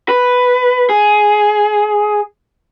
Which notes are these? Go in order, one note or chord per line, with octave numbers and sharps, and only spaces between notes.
B4
G#4